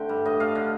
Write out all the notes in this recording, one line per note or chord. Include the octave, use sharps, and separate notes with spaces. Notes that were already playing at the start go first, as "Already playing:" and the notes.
Already playing: D3 A3 C4 G5
G2
A2 D#5
A3 F5
D3